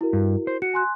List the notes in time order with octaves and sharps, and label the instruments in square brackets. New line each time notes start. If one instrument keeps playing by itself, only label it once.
[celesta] E4 F#4 A#4
[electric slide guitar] G2
C5
[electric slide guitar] F#4 [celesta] C#7
[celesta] G#5 C6 F#6